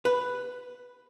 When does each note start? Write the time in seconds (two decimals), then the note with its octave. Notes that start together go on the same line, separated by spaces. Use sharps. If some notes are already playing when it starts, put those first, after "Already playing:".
0.05 B4